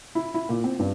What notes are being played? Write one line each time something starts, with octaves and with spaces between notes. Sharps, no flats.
E4
E4
A#2
C4
G2